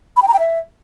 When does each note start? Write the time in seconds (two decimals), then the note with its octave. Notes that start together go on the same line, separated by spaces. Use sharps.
0.17 B5
0.22 G5
0.28 A#5
0.34 G5
0.39 E5